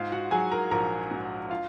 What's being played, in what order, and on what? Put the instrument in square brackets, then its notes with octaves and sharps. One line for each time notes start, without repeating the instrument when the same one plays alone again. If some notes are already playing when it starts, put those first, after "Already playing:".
Already playing: [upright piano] G#2 F4 F5
F#4 F#5
F#3 G#4 G#5
A#4 A#5
A#1 A#4 A#5
G#2 F#4 F#5
F4 F5